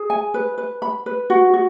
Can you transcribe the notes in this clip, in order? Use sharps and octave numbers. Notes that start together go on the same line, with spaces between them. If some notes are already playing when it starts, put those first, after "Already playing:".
Already playing: G#4
G#5
B4
B4
B5
B4
F#4
F#4